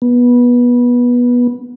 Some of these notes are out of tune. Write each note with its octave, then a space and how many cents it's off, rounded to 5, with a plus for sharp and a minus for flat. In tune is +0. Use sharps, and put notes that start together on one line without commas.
B3 -20